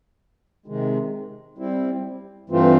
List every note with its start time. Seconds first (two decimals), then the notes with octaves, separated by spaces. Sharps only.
0.66 C3 D#3 G#3
1.58 G3 C4 E4
2.50 G2 E3 A3 C4 F4